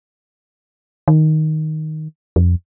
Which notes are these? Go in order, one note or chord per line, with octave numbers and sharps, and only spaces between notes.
D#3
F2